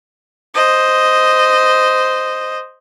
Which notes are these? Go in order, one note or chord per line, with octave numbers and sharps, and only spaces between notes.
C5 D#5